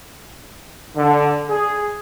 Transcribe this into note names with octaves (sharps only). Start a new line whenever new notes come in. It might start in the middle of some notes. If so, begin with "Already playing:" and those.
D3
G#4